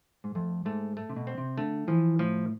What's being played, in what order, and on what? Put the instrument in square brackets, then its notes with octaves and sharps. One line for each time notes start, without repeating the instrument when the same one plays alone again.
[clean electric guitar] G#2
[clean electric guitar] F2 [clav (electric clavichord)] A3
[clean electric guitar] G#2 [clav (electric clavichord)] A3
[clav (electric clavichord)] A3
[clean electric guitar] C3
B2
[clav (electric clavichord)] C4
[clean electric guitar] C3
[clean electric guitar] D3 [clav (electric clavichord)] A3
[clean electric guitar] E3 [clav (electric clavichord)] F3
[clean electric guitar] A2 [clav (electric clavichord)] F3